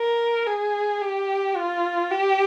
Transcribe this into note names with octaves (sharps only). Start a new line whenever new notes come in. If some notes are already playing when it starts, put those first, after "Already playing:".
Already playing: A#4
G#4
G4
F4
G4